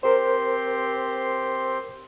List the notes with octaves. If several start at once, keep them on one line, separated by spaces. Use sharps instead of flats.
C4 G4 A#4 C5 C6